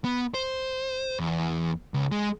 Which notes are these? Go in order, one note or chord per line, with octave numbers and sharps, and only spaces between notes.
B3
C5
E2
C#2
G#3